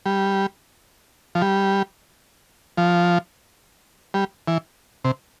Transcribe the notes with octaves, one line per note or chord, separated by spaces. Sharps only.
G3
F3
G3
F3
G3
E3
C3